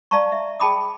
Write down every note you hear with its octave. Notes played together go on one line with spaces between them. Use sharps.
D5 F5 A5 A#5 C#6
E5
G#4 G5 A5 B5 D6 D#6